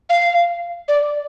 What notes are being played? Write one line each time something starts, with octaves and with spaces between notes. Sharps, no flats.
F5
D5